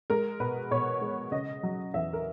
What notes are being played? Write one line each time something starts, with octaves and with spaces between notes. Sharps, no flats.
G#3 A#4
B2 B4
B2 C#5
G#3
C#3 D#5
F#3
E2 E5
A#4